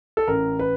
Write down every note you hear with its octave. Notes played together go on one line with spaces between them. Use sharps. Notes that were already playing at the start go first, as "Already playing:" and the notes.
A4
A1 A#4
B4